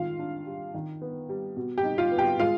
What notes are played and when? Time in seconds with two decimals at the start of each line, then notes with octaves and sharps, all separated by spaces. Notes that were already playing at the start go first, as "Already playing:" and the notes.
Already playing: D#3 G#3 F4 F5
0.19 D4
0.46 G3
0.74 D#3
1.02 B3
1.29 G3
1.57 B2
1.78 G4 G5
1.84 D#4
1.98 F4 F5
2.12 B3
2.18 G4 G5
2.40 G#3 F4 F5